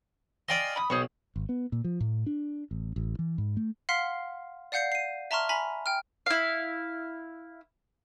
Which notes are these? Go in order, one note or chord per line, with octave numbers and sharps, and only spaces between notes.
D5 D#5 F5 G5 G#5 C6
B5 D#6
B1 G#4 C5 C#6
G#1
B3
A#2
F3
A2
D4
A1
A1
E3
G#2
A3
F5 F#5 C6 F6 B6 C7
D5 F5 F#5 G6 C7 C#7
C7 D#7
E5 A5 A#5 C6 C#6 F6
G#5 A#5 B5 B6
G5 F6
E4 F5